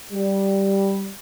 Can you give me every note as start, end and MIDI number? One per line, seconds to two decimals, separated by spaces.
0.13 1.11 55